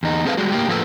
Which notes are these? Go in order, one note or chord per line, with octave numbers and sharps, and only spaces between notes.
E2 D#4
C4 G#4 A4 B4 F5
G3 G#3 F#4
A2 A#3 G4
A2 F3 A#3 C#4 A4 B4